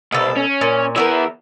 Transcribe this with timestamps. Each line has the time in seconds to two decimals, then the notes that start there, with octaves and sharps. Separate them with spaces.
0.12 C2 B2 A4
0.37 C#4
0.61 A#2
0.96 E3 B3 A#4 C#5 E5